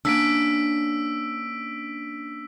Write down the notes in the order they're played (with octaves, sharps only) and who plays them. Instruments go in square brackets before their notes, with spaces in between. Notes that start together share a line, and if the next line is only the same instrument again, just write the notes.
[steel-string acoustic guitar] A#3 C#4 D4 [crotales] E6 B6 D7